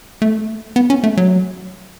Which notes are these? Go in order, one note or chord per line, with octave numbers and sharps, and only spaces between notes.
A3
B3
C#4
A3
F#3